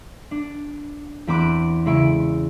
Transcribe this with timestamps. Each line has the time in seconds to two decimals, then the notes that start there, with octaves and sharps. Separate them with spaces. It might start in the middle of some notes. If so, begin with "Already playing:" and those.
0.31 D4
1.27 E2 C4 B5 D6 F#6
1.86 C#3 G#3 E4 C#6 D7